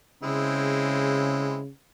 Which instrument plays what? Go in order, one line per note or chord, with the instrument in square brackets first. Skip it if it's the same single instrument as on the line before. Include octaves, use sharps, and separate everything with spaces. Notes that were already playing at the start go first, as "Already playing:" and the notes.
[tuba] C#3 [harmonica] G#3 C4 E4